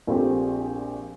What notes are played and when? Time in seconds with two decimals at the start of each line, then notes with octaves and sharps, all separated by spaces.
0.07 A#1 A#2 A3 C4 G4